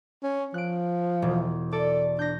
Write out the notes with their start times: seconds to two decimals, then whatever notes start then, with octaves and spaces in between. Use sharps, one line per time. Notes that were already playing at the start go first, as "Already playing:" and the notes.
0.23 C#4
0.54 F3 F#6 D7
1.22 E1
1.73 A4 D5
2.19 D4 G6 A#6